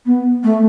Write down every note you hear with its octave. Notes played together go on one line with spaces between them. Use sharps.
B3
A3